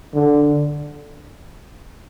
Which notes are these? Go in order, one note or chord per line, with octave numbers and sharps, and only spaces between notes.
D3